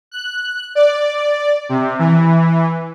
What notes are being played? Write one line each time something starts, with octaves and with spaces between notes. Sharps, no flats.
F#6
D5
C3
E3